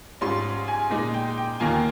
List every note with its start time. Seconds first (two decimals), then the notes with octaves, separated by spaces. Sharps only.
0.21 G#2 G3 C#4 F4 C6
0.68 G#5
0.90 A#2 G#3 D#4
1.14 G5
1.38 G5
1.60 D#2 D#3 A#3 F4 G#5